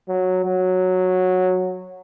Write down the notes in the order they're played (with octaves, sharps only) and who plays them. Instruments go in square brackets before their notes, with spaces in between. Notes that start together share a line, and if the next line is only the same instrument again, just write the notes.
[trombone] F#3
F#3